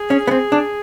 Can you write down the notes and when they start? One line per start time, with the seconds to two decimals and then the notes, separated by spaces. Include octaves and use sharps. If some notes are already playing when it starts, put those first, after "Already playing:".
Already playing: G#4
0.10 C#4
0.28 B3
0.31 C4
0.52 D4